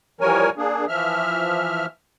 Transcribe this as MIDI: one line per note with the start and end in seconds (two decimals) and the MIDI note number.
0.21 0.50 52
0.21 0.50 53
0.21 0.50 55
0.21 0.50 70
0.21 0.50 73
0.21 0.50 80
0.57 0.85 58
0.57 0.85 62
0.57 0.85 68
0.88 1.86 52
0.88 1.86 53
0.88 1.86 76
0.88 1.86 89